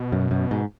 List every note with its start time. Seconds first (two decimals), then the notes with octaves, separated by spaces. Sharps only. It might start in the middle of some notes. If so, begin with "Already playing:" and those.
Already playing: B2
0.12 F#2
0.31 F#2
0.51 G#2